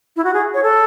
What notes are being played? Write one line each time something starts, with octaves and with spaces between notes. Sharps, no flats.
E4
F#4
G#4
C#5
A4